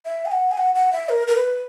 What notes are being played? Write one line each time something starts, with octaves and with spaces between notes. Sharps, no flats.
E5
G#5
F#5
G#5
F#5
F#5
E5
A#4
A#4
B4